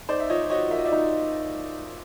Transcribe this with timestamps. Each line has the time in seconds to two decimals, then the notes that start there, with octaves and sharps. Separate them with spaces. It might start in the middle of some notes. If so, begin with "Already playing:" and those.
0.09 D#4 C5 D5
0.20 E5
0.29 F3 C#5 D#5
0.50 F#4 C#5 D#5
0.71 A#3 E5
0.78 D#5
0.85 D5 E5
0.92 D#4